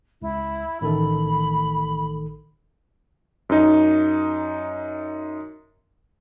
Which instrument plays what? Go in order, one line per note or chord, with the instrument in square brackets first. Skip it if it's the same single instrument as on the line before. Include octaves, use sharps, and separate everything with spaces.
[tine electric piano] C#2 [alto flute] E4
[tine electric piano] A1 D#3 A4 [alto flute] B5
[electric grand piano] F#2 D#4